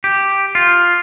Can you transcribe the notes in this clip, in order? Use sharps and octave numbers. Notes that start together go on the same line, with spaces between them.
G4
F4